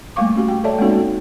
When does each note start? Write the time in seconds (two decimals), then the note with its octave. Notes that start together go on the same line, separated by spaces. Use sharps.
0.16 G3 A3 A#3 F5 C#6 D6
0.36 C#4 F#4 G4
0.48 G5
0.64 A4 C#5 D5 E5 A5
0.79 G#3 A#3 C4 C#4 D#4 F#4
0.98 F#4